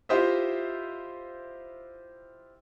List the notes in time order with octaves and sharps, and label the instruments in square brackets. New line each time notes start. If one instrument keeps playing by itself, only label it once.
[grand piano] E4 F4 G4 C5 D#5 E5